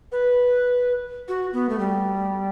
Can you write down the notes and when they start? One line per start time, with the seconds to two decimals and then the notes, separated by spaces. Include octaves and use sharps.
0.12 B4
1.28 F#4
1.53 B3
1.69 A3
1.79 G3